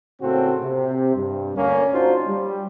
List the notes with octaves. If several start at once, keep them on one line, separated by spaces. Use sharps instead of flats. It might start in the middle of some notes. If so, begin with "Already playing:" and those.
A2 C#3 A#3 C4 F#4 A4
C3
G2
D2 A#3 C#4
D4 D#4 F4 F#4 C5
G3